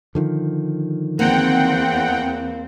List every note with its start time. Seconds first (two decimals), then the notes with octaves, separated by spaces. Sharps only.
0.15 D3 D#3 F3
1.19 E2 A#3 C4 F#5 G5